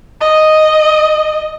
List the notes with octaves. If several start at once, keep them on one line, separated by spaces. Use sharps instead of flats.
D#5